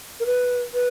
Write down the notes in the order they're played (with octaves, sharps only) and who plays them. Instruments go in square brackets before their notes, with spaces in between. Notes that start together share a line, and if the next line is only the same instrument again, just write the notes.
[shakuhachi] A#4
B4
B4